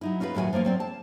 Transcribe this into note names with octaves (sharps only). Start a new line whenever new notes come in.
F#3 D#4 E4
C#4 D#4 F4 F#4 B4
D#2 A2 F#3 G#4 F#5 G#5
F3 F#3 A#3 F4
F#3 C4 D5
A5